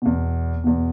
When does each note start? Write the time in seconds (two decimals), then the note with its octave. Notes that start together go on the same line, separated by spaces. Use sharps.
0.02 E2 B2
0.64 E2 B2